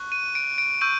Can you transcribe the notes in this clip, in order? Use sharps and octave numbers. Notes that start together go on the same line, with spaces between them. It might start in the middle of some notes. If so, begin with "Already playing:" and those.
Already playing: C#6 F#6
D#7
D7
D7
C#6 E6 G6 D#7